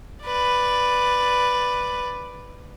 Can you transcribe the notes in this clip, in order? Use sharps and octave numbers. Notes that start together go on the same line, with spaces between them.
B4 D5